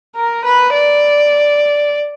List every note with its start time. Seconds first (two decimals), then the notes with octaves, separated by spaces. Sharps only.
0.16 A#4
0.45 B4
0.74 D5